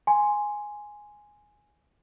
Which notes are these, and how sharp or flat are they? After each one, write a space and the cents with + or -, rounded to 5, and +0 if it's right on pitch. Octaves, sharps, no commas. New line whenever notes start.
G#5 +0 C6 +0